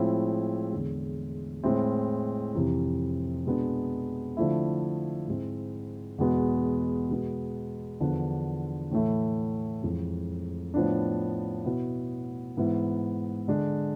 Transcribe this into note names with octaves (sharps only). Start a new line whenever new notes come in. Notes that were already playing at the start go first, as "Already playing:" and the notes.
Already playing: A2 F3 G#3 C4 E4
E2 D3 G#3
A2 G#3 C4 E4
F2 C3 E3
B2 G#3 B3 D4
D3 F3 A3 E4
G#2 G#3 C4 E4
E2 B2 G#3 B3
B2 G#3 B3
E2 D3 F3 B3 D4
A2 E3 A3 E4
F2 E3 G#3
A2 F3 B3 D4
B2 B3 E4
G#2 E3 B3 E4
D3 G#3 D4